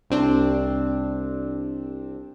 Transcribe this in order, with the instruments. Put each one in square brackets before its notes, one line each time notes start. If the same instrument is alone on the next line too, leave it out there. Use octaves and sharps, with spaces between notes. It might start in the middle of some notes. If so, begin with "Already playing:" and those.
[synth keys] C2 C4 D4